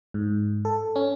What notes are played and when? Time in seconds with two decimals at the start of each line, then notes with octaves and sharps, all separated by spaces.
0.14 G#2
0.65 A4
0.96 C#4